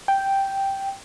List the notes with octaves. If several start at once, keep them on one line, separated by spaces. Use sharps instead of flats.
G5